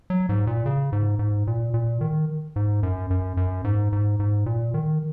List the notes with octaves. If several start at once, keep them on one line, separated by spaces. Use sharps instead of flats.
F#3
G#2
A#2
C#3
G#2
G#2
A#2
A#2
D#3
G#2
F#2
F#2
F#2
G#2
G#2
G#2
A#2
D#3